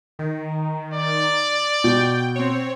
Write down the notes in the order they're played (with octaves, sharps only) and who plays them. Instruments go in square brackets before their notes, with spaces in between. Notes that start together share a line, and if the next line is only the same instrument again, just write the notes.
[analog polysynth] D#3
[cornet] D5
[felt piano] B2 [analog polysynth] G5
[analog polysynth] C4 C#5